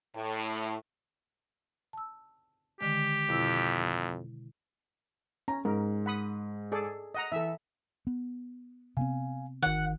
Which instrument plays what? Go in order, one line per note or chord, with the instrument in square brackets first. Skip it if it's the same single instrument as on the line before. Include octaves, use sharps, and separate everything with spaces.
[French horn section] A2
[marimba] A5 E6
[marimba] D3 D#3 G#3 [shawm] G4
[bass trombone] F2 [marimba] B2 E4 E6
[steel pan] C#4 [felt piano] A#5
[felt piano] G#2 [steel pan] A#4
[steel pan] F#5 B5 D#6
G#4 A4 D5
D#5 F#5 A#5
[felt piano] E3 [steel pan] A4 E5
[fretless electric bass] B3
[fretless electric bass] C3 B3 C4 [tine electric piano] F5 G#5
[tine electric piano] G1 D#3 [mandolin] F#5